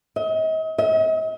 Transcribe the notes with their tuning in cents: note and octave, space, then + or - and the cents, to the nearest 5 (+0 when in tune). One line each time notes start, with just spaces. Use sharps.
D#5 +40
D#5 +45